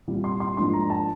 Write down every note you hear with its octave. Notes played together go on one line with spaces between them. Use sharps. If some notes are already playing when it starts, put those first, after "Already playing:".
C2 A#2 G3
C6
C6
G#2 F3 A#3 D4 C6
A#5
A5